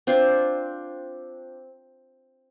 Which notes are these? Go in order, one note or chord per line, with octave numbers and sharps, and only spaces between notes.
C4 D4 F4 C5